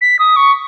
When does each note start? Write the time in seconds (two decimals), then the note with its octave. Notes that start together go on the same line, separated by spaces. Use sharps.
0.01 B6
0.19 D#6
0.36 C#6